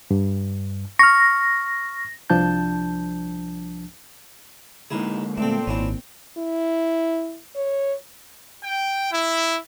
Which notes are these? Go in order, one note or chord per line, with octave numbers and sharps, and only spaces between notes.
G2
C#6 F6 A#6
C2 F3 D4 A5 G6
D2 G#3 A#3 D#4 E4 G#4
A#2 A3 C4 D4 A4
G#1 C#4 D4 E4
E4
C#5
G5
E4